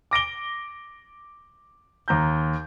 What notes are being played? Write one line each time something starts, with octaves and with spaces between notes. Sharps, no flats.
D6 A#6 D7 G7
D#2 A#5 G6